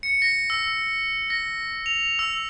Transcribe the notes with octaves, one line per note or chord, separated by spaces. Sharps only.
C#7
A#6
E6
A#6
F7
E6